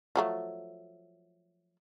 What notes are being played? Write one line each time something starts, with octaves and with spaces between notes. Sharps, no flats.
F3 F#3 A3